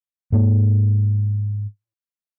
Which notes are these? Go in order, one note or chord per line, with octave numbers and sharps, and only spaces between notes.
G#2 A#3